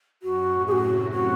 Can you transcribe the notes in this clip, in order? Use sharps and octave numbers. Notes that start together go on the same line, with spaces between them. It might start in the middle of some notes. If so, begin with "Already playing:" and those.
F#2 F#4
A2
G#4
F#4
C3
F#4